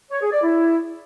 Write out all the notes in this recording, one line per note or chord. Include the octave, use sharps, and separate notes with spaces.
C#5
G#4
D5
E4